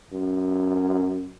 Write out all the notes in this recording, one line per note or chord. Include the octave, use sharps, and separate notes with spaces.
F#2